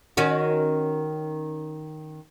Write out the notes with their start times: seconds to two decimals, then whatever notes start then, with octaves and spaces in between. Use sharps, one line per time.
0.17 D#3 C#4 F#4